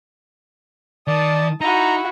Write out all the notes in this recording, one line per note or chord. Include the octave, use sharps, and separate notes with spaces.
D#3 D5 A5 D#6
D#4 E4 F#4 A#5